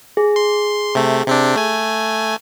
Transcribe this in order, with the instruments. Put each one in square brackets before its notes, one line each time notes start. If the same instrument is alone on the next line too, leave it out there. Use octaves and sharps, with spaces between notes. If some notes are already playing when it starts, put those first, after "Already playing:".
[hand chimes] G#4
[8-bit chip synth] C6
C3 A3
C3 C4 D4
A3 G#5